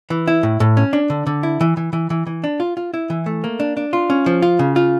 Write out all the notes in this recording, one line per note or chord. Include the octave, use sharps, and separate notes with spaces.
E3
E4
A2
A2
C#4
D4
D3
D3
E4
E3
E3
E3
E3
E3
D4
F4
F4
E4
E3
A3
A#3
D4
D4
F4
C#4
F3
F4
C#3
F4